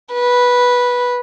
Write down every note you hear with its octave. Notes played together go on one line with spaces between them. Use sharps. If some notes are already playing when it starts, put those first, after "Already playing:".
B4